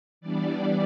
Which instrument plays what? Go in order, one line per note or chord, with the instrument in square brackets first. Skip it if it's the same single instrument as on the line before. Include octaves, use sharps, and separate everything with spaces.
[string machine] E3 G3 B3 D4 D5